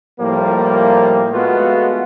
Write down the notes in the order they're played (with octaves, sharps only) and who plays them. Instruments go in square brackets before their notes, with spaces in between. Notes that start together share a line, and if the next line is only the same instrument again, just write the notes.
[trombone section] A2 F3 G3 A#3
G#3 A3 B3 F4 F#4 A4